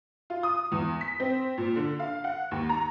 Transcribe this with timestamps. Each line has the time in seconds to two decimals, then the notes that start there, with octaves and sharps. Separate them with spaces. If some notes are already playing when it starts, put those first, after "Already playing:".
0.30 F4
0.43 D#6
0.72 E2
1.01 B6
1.20 C4
1.58 A#2
1.76 D3
1.99 F5
2.24 F#5
2.51 D#2
2.69 A#5